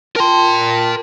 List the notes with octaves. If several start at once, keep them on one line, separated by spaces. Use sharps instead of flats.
F4 A#4 G5 A5 C6